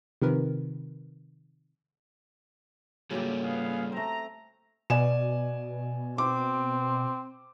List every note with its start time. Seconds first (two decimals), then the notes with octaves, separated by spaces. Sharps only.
0.22 C3 D#3 F3 A#4 B4
3.11 C#3 F#3 G3 A#3 F4 G4 A4
3.43 B3 G#4 F5
3.92 A3 C4 A#5
4.90 B2 D5 G#5 E7
6.18 C4 D6